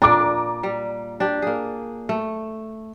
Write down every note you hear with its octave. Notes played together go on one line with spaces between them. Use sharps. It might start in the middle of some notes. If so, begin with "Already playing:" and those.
A#2 D4 A#5 D6
G3
D4 G4
A#3 G#4
A3